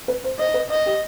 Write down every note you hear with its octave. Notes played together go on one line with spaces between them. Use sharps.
B4
C5
C5 D#5
B4
D#5
G4